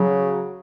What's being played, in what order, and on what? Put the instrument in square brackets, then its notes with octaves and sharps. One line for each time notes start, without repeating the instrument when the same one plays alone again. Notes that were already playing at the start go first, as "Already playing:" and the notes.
Already playing: [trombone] C#3 [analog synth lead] F#3